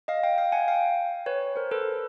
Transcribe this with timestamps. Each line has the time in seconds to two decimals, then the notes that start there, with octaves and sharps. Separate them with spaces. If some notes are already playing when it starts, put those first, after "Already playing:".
0.08 D#5 F5
0.23 F5 G5
0.38 F5 G5
0.52 F#5 G#5
0.68 F5 G5
1.26 B4 C#5
1.56 A#4 C5
1.71 A4 B4